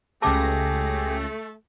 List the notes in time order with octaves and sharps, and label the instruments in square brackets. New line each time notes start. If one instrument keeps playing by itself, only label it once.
[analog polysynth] C#2 C#3 A#6 [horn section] A3 [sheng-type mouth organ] G4 G#4 [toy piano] A5 D6